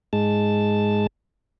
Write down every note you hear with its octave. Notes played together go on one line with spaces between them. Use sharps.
G#2 G#3 A5